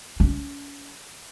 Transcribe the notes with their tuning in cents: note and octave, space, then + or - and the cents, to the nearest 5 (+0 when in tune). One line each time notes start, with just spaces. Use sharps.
C#4 +35